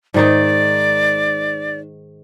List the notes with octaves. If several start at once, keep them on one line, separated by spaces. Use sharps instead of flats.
G#2 D#3 D#4 D5